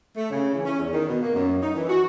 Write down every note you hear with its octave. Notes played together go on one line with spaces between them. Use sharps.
A3
C#3
E3
C#4
E2
D#3
B2
A#3
F#2
D#4
E3
F#4